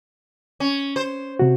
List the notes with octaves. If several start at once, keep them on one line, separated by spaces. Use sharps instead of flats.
C#4
C5
C3 F#4